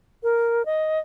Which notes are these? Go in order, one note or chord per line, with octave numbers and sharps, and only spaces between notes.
A#4
D#5